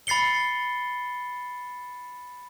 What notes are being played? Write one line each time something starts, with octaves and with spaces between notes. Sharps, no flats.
B5 A6 C7 C#7 G7